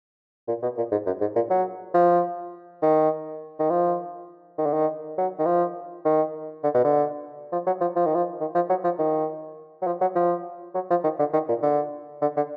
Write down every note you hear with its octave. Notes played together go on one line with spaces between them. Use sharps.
A#2
B2
A#2
G#2
F#2
G#2
A#2
F#3
F3
D#3
D#3
F3
D#3
D3
D#3
F#3
D#3
F3
D#3
D3
B2
D3
F3
F#3
F3
F3
D#3
F3
D#3
F3
F#3
F3
D#3
F#3
F3
F#3
F3
F#3
F3
D#3
D3
D#3
A#2
D3
D3
D3